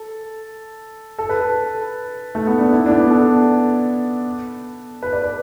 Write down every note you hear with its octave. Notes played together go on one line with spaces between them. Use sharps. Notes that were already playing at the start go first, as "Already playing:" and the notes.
Already playing: A4
A4
B4
A4
A3
B3
D4
E4
D4
B3
A4
A4
B4
D5
B4